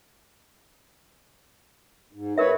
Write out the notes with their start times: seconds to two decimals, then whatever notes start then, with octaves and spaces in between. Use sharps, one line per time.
2.13 G#2
2.38 A#4 B4 C#5 E5